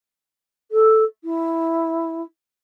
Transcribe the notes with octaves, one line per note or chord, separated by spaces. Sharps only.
A4
E4